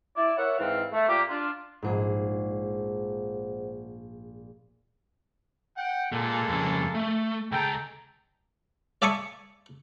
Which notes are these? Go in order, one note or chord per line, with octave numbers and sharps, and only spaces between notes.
E4 D5
A#4 C#5 E5 F#5
G#2 E3 C4 F5
A3
A#2 A#3 G4
D4 F4
A#1 G#2 G#4 C5 F#5
F#5 G5
A#2 G#3 A#3 A4
F2 C#3
A3
C#2 G#4 A4 G5 A#5
D5 E5 G#5 A5 C#6 D#6